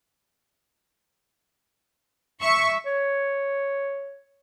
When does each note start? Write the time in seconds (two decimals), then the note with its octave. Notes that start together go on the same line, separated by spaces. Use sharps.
2.42 E5 C#6
2.85 C#5